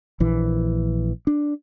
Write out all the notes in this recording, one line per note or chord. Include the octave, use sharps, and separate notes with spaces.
A#1 E3
D4